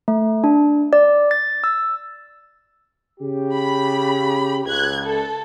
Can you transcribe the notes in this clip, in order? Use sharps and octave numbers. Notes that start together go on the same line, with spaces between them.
A3
D4
D5
A6
E6
C#3 G4
B5
C#2 F#6 G#6
A4